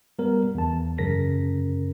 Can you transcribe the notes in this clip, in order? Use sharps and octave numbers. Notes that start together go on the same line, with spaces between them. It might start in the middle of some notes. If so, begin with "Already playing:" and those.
G3 B3 A#4
E2 A5
F#2 C#3 A#4 A#6 B6